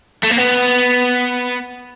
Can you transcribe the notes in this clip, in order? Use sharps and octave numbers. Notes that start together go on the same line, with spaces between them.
A3
A#3
B3